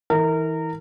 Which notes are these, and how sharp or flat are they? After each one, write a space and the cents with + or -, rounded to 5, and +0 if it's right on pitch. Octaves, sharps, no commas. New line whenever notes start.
E3 -35 A#4 -25